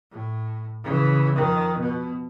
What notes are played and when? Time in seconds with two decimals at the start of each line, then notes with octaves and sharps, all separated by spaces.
0.11 A2
0.83 C#3 E3
1.34 F2 D#3
1.78 B2